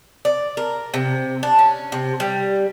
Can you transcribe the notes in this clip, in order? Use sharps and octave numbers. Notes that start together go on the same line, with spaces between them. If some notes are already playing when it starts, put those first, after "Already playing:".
D5
A#4
C3
D4
C#4
C3
G3